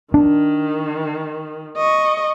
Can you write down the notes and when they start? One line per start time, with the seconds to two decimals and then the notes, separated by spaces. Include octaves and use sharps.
0.14 D#3 D4
1.77 D#5 C#6